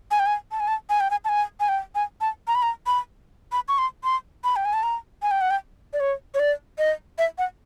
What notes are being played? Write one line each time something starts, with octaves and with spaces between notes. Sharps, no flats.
G#5
G5
G#5
A5
G#5
A5
G#5
G5
G#5
A5
G#5
G#5
G5
G#5
A5
A#5
B5
A#5
B5
B5
C#6
C6
C6
B5
G5
G#5
A5
A#5
G#5
G5
F#5
G5
D5
C#5
C#5
D5
D#5
E5
F#5